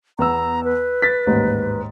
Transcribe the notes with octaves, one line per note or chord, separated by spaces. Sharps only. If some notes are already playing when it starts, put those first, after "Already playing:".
E2 B3 A#5 E6
B4
A6 B6
A1 D#2 G#2